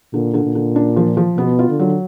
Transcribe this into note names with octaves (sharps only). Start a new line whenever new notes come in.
A#2 D3
D3
A#2
D3
D4
F3
F3
B2 B3
F4
D3
F#3